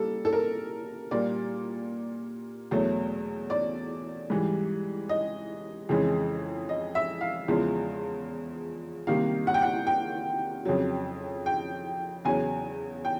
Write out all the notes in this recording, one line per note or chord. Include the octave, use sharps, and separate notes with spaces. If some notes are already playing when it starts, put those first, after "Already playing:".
Already playing: G3 A#3 A4
A4
A#4
A#2 G3 A#3 D5
E2 B2 F#3 A3
D5
G#2 E3 G3
D#5
F2 C#3 E3 G#3
D#5
E5
F5
E2 C#3 F3 G#3
C3 D#3 G3 A#3 F5
F#5
G5
F#5
G5
F2 C#3 F#3
G5
E2 C#3 F#3 G#5
G5